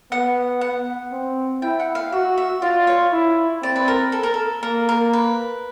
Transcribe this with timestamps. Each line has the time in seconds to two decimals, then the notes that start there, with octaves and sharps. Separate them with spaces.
0.11 B3 F#5
0.61 F#5
1.12 C4
1.62 E4 G5
1.80 F#5
1.95 F5
2.12 F#4 E5
2.38 E5
2.62 F4 D5
2.87 C#5
3.13 E4
3.62 C4 D5
3.76 B4
3.88 A#4
4.12 A4
4.23 A#4
4.34 A4
4.63 A#3 A#4
4.89 A#4
5.13 B4